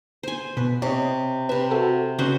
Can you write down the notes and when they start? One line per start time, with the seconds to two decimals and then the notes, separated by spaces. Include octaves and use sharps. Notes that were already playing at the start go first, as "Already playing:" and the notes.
0.23 C5 G#5
0.57 B2 B4
0.82 C3 C#5 D#5
1.49 C3 B4 E5
1.71 F#4 A4
2.19 C#3 C#4 F#4 B4 C5